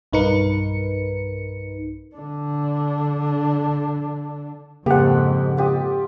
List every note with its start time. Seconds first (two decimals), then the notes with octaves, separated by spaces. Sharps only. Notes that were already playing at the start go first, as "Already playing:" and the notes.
0.13 B1 G2 D#4 A#4 B4 C#7
2.16 D3 D4
4.86 F2 G#2 C#3 A#3 G4 A4 C5 F#5
5.57 F4 G4 D#5